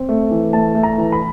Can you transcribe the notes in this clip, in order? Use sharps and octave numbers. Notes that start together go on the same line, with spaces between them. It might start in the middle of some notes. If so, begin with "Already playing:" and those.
Already playing: C4
A3
E3
A3 A5
A3
A#5
E3
B5